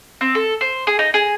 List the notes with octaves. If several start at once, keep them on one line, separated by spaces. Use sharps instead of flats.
C4
A4
C5
G#4
D#4
G#4